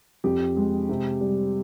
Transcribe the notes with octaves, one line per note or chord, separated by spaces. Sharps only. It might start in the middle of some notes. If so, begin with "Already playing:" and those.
F2 G4
G#3
C3
G3